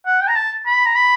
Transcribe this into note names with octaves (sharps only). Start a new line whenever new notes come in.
F#5
G5
A#5
A5
B5
A#5
B5